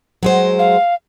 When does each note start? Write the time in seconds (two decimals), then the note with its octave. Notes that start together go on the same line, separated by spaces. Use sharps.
0.23 F#3 G#3 C5
0.59 F5